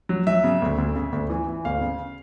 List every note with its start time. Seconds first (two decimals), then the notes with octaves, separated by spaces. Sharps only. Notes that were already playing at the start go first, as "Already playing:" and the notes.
0.09 F#3
0.27 F#3 E5
0.44 C#3
0.62 D2
0.78 D2
0.95 C#3
1.12 D2
1.30 E3
1.47 E3
1.65 D2 F5
1.81 C#3